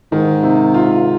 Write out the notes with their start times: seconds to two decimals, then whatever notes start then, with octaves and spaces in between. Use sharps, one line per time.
0.12 G#2 D#3
0.43 C3
0.74 F4